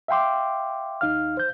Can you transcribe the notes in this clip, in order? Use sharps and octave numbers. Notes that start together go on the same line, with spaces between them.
E5 F5 G5 C6 D6
D#2 D#4 F5 F6
C5 G6